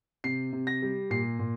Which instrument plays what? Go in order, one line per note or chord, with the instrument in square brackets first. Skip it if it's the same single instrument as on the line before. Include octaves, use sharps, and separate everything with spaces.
[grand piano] C3 C7
C3
A#6
G3
A#2 C7
A#2